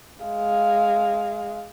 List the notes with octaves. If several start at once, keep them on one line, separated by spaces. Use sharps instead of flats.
G#3 F5